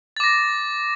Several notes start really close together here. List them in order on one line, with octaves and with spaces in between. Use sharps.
A6 D6 A#6